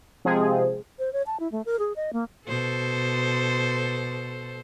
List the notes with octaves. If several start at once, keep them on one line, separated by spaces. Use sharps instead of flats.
C3 F3 G#3 C4 G#4
C5
C#5
A5
E4
A3
A#4
G#4
D#5
A#3
B2 A4 C5